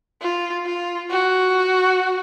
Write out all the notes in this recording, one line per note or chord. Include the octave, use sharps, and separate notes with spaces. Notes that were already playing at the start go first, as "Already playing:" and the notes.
F4
F4
F#4